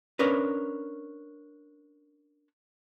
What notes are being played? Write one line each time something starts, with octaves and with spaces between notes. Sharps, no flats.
C#4 D4 A#4 B4